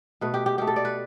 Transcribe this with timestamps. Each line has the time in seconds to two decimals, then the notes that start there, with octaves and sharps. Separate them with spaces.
0.21 B2 A3 B4
0.34 G4
0.46 G4
0.58 B2 A3 G4
0.67 A4
0.76 D5
0.85 B4